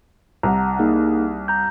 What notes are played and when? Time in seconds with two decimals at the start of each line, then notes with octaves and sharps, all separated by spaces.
0.43 C2 F#5 A#5
0.79 A#3 D#4 G#4
1.48 A#5 G6